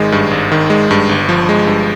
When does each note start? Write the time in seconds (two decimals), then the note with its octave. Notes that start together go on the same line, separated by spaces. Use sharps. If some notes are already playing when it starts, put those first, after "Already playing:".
Already playing: G#1 D#3 G#3
0.12 G2
0.31 G#1
0.52 D#3
0.70 G#3
0.91 G2
1.09 G1
1.29 F3
1.49 G#3
1.67 G2